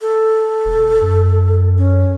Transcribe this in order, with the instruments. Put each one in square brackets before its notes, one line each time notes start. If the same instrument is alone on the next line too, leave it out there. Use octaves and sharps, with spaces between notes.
[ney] A4
[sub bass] E1
F#2
[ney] C#4